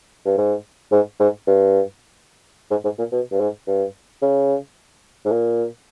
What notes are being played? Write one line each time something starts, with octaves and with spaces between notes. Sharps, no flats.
G2
G#2
G#2
G#2
G2
G#2
G#2
A#2
B2
G2
G#2
G2
C#3
G#2
A#2